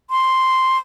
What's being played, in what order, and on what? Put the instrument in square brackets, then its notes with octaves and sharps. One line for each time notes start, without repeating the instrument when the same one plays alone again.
[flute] C6